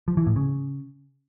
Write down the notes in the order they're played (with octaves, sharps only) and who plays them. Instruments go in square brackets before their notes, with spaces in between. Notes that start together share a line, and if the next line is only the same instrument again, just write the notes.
[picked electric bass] F3
E3
A2
C#3